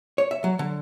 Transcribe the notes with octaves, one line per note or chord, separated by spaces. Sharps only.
C#5
E5
F#3
D3